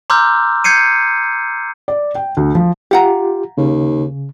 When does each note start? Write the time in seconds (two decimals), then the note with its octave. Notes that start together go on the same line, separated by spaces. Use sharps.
0.10 A#5 C6 D6 E6 F6 G6
0.64 G6 G#6 C7 C#7 D#7
1.88 D5
2.15 G5
2.37 D2
2.55 F3
2.91 F4 G4 F5 F#5 A#5
3.58 D#2 C#3